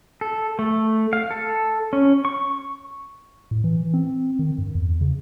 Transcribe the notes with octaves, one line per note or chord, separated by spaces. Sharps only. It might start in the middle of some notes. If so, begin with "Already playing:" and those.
A4
A3
F5
A4
C#4
C#6
A2
E3
C4
D#3
G2
E2
C#3